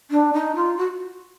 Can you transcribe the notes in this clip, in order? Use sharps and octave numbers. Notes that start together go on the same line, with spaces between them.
D4
D#4
F4
F#4